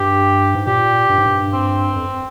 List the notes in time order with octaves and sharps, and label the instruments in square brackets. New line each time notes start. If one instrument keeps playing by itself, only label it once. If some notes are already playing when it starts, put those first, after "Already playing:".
Already playing: [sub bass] G2 [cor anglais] G4
[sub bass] G#2
[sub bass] A#2 [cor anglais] G4
[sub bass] G2
G#2
G2
[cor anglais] C4
[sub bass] F2